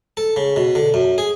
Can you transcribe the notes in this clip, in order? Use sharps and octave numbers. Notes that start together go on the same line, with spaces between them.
A4
C#3
B2
D3
F#2
G#4